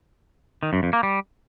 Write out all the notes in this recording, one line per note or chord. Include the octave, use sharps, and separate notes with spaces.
D#3
F#2
F2
A#3
G3